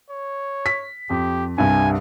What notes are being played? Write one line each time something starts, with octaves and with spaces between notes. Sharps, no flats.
C#5
B6
F2 G4
C2 G2 G#5